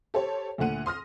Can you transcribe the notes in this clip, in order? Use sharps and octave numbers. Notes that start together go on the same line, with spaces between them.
G4 A4 C5 C#5
D2 A#2 D3 F#5 D#7
C6 D#6 F6 A#6